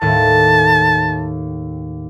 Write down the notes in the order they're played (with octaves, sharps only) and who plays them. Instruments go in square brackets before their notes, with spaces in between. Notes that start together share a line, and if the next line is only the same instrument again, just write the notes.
[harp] D#2 A2 [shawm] A5